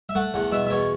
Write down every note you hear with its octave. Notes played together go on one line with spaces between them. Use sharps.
E5
A3 F#5
E2 F#5
B2 E5
E5
E2 C#5